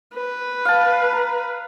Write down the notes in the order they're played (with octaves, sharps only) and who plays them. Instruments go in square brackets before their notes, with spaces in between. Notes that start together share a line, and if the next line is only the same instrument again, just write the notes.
[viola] B4
[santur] F5 A5
A#5